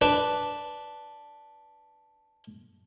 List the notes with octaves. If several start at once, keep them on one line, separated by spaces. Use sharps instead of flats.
D4 B4